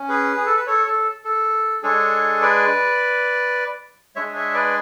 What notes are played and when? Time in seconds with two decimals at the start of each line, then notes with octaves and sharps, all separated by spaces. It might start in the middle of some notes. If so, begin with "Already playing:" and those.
Already playing: C#4
0.09 G#4 B4
0.36 G#4
0.46 A4
0.56 B4
0.67 A4 C#5
0.87 A4
1.25 A4
1.83 G#3 D4 G#4 A4 C#5
2.42 B4 D5
4.16 G#3 D4 G#4 C#5 E5
4.36 C#5 E5
4.54 B4 D5